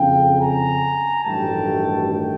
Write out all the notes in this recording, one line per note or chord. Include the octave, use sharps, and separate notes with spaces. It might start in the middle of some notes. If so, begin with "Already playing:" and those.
Already playing: F#1 F2 C#3 F5 G5
G#5 A#5
A1 G2 D#3 F#3 A3 G5 A5
G5